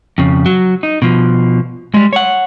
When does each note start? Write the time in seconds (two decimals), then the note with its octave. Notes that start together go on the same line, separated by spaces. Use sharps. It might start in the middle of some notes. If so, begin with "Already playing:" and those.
0.18 F2 C#3
0.46 F#3
0.83 D#4
1.02 B2 F3
1.94 G3 G#3
2.13 C#5 F#5